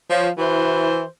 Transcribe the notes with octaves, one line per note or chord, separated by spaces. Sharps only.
F3 C#5
E3 E4 F#4 C5